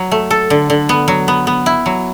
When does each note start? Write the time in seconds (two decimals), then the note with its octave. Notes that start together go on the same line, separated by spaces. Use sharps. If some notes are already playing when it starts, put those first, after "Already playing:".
Already playing: F#3
0.11 A3
0.31 A4
0.50 D3
0.70 D3
0.89 B3
1.08 F#3
1.28 B3
1.47 B3
1.66 E4
1.86 F#3